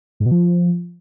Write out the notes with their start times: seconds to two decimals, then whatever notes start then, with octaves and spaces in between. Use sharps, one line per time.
0.20 G#2
0.26 B2
0.31 F3